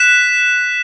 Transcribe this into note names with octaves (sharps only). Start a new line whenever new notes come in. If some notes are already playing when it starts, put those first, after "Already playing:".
Already playing: F#6 B6 E7